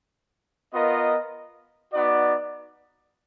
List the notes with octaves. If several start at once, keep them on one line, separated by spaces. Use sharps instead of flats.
B3 F4 A#4 D#5
B3 D#4 F#4 D5